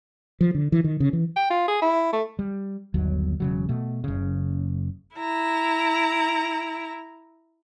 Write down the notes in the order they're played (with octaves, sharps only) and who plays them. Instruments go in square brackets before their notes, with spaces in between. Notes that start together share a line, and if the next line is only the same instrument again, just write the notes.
[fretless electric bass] F3
D3
E3
D#3
C#3
E3
[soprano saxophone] G5
F4
G#4
E4
A3
[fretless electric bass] G3
G1 D#2 F#3
E1 C#3 F#3
B2 A3
F#1 C#3
[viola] E4 A#5